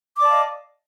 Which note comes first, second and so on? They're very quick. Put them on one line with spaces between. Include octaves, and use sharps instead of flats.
D6 D5 A5 F5 D#5